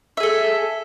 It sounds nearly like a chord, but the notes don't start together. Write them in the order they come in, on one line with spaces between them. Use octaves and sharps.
E5 G#4 A4